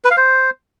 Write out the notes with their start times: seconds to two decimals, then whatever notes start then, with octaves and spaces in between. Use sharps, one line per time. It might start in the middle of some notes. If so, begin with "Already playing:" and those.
0.04 B4
0.11 F5
0.17 C5